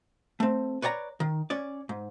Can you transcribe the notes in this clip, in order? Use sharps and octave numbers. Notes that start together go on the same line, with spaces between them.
A3 C4
B4 C#5 D5 G5 A#5
D#3
C#4 D5
G#2